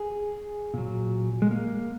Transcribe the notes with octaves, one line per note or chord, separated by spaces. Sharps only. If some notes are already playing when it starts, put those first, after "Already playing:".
Already playing: G#4
A#2 F#3
G#3
A#3